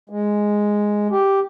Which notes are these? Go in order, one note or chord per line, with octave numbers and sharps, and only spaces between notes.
G#3
G4